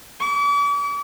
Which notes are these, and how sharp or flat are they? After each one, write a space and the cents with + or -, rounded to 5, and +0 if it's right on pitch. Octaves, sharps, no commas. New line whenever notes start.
D6 -45